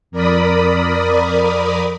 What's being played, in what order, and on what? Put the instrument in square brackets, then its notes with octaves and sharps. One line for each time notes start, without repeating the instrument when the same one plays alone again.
[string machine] F2 A#4 D5 B5 D#6